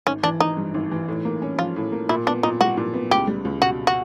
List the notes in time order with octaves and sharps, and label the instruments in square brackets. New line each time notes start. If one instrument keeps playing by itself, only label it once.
[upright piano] G#1 [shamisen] C#4
[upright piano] E3 [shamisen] D4
[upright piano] G#1 [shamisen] D#4
[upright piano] G2
G#1
E3
A2
A#3
C#4
[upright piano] F3 [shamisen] F4
[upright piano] A2
A#3
[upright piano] A#2 [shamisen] E4
[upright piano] B3 [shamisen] D4
[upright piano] A#2 [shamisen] D#4
[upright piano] G3 [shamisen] F#4
[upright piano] A#2
B3
[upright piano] C#2 [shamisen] G4
[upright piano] G3
C#2
[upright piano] B2 [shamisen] F#4
[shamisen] F#4